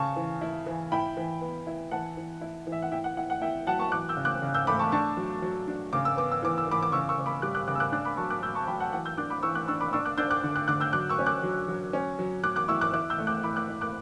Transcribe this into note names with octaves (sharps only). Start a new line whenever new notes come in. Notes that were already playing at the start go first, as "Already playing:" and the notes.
Already playing: C#3 A5 C#6
E3
E4
E3
E4 G5 B5
E3
B3
E4
E3 F#5 A5
E3
E4
E3
E5
F#5
E4 E5 G5
F#5
E4 F#5
F#5
E4 E5 G5
F#3 F#5 A5
A5 C#6
E3 D6 F#6
E6 G6
C#3
D6 F#6
C#3
E6 G6
A3 B5 D6
A5 C#6
D4 A5 C#6
F#3
F#3
D4
C#3 D6
E6
B3 D6
E6
E3 D6
E6
E3 B5 D6
D6
C#3 C#6 E6
C#6 E6
C#3
B5 D6
G3 D6 F#6
D6 F#6
C#3 D6 F#6
E6
D6 F#6
D4 D6 F#6
B5 D6
F#3 A5 C#6
D6 F#6
F#3 E6 G6
A5 C#6
F#3 G5 B5
F#5 A5
E3 F#5 A5
E6 G6
D4 D6 F#6
B5 D6
E3 C#6 E6
D6 F#6
D4 C#6 E6
B5 D6
D4 C#6 E6
D6 F#6
D4 E6 G6
D6 F#6
D3
D6 F#6
D3 D6 F#6
E6 G6
F#3 D6 F#6
C#6 E6
C#4
D6 F#6
F#3
F#3
C#4
F#3
F#3 D6 F#6
D6 F#6
E4 C#6 E6
D6 F#6
E4 D6 F#6
E6 G6
A3
D6 F#6
E4 B5 D6
D6 F#6
E4
D6 F#6